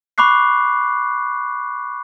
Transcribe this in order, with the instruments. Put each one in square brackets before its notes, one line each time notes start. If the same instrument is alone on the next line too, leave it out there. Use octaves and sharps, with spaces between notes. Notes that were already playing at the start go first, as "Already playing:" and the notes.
[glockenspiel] B5 C#6 D6 F#6 C7